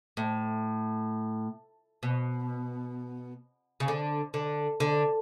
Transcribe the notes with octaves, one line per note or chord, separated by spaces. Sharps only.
A2
B2
C#3
D3
D3
D3